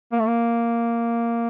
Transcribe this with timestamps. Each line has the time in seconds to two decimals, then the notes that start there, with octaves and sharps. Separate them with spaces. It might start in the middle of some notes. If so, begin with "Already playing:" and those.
0.12 A#3
0.19 A3
0.27 A#3